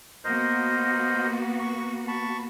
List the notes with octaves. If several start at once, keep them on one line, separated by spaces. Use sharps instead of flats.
A#3 B3 F#4 A#4 C5 D#5
C#6
A5 B5 C#6